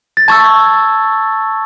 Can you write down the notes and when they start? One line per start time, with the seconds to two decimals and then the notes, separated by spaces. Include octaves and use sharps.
0.17 A6
0.28 A5 C#6 E6 G#6